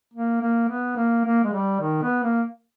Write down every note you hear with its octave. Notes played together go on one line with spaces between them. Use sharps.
A#3
A#3
B3
A#3
A#3
G#3
G3
D#3
B3
A#3